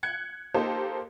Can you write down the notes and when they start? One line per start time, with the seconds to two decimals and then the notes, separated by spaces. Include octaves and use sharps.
0.03 F#6 G#6 C#7
0.54 A#3 D#4 G4 A4 C5